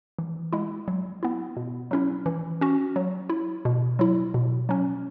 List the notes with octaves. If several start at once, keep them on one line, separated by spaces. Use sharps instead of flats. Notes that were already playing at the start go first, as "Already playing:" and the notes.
E3
G#3 E4
F#3
B3 E4
B2
F#3 C#4 E4
E3
C#4 F#4
F#3
E4
B2
F#3 E4
B2
F#3 C#4